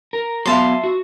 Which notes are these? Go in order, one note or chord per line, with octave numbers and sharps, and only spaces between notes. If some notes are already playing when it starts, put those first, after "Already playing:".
A#4
F#3 B3 E5 F5 A5 C6
F#4